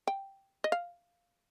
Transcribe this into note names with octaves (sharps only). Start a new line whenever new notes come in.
G5
D#5
F5